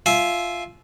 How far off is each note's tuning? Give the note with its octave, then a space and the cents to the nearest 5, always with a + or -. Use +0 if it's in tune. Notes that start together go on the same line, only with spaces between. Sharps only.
F4 +0 E5 +0 G#5 +40